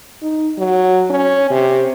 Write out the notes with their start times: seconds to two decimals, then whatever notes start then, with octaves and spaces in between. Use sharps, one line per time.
0.22 D#4
0.58 F#3
1.10 C#4
1.50 C3